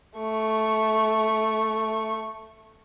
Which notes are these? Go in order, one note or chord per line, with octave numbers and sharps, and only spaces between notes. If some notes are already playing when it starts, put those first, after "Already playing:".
A3 C#6